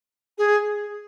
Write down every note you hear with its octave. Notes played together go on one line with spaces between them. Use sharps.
G#4